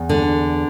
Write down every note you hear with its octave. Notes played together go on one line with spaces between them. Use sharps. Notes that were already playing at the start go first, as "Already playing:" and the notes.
Already playing: E2
D3